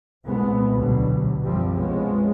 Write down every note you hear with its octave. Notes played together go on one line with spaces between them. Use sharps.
C2 A#2 G#3 A3 B3
A1 D2 B2 D3 F#3 G3
C2 F#2 F3 G3 C4
C3 F3 G#3 B3 C#4